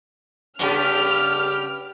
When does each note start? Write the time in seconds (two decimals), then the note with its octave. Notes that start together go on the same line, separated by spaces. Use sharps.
0.59 G2 C#3 B3 G4 F6